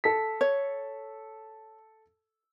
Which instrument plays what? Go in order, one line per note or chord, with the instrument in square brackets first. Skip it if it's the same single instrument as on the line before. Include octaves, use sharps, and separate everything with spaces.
[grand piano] A4 B6
[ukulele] C#5